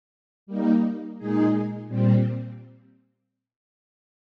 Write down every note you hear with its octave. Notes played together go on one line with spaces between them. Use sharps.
G3 A#3 D#4
A#2 G#3 D#4 G#4
A#2 G3 C4